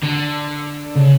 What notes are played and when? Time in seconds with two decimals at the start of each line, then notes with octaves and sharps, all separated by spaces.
0.03 D3
0.96 C#3